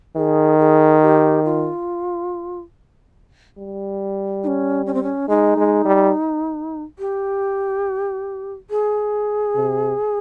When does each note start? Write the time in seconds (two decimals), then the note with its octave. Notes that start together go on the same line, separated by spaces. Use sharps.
0.16 D#3 G#4
0.59 G#4
1.02 G4
1.45 F4
3.58 G3
4.43 D#4
4.47 C#4
4.86 C#4
4.94 C4
5.03 C#4
5.28 G#3 D#4
5.57 G#3
5.85 G3
6.99 G4
8.70 G#4
9.55 C3